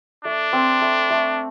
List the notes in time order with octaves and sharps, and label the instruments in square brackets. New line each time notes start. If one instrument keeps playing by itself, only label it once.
[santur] A3 [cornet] D4
[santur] C4
A3
A3